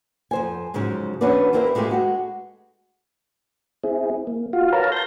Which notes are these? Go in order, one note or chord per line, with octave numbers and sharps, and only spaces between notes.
F2 C5 G#5
F2 G#2 C#3 F#3 C#4
E3 C#4 D4 F#4 B4 D5
A#3 C4 E4 G4 A4 A#4
G#3 A3 F4 G4 G#4
G#3 F#4
C4 E4 G#4
A#3
F4 F#4 F5
A#4 B4 C#5 F5 A5 A#5
A5 A#5 C6 G6 A#6